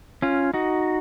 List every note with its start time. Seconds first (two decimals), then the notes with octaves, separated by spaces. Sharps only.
0.22 C#4 F4
0.54 D#4 F#4